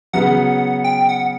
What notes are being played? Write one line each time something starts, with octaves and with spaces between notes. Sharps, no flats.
C#3 F#3 B3 F#5
G5
F#5